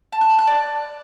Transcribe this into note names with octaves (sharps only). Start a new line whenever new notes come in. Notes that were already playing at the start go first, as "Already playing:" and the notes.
A5
F#6
B5
F#6
D5